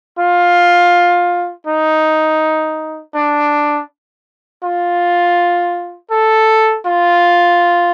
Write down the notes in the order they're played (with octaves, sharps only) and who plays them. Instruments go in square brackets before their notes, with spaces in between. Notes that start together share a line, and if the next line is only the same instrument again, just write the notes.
[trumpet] F4
D#4
D4
F4
A4
F4